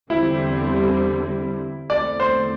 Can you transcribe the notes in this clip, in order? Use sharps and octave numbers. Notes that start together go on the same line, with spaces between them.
E2 D3 G3 C4 E4
E2 D3 A3 C4 D5
C5